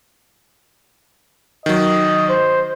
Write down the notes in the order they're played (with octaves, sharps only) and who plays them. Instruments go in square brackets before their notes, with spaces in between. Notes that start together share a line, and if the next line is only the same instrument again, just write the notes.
[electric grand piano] D#3 F#3 [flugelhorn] D#5
[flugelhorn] C5